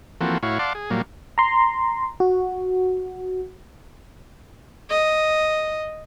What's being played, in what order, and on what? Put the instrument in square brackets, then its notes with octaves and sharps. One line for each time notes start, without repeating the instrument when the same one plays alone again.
[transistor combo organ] E3 F3 A#3 C4 F#4 A4
A2 E4 F#4 C#5 F5
D5 F5 F#5 A5 C6 D6
G#4
A#2 F#3 G3 A#3
[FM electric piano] A#5 C6
F#4
[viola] D#5